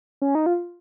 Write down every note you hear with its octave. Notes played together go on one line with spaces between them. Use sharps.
C#4
D#4
F4